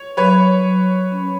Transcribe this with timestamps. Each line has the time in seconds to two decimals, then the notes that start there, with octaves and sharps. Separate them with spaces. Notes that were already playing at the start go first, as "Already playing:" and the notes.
Already playing: C#5
0.17 F#3 B4 C#5
0.65 F#3
1.12 C#4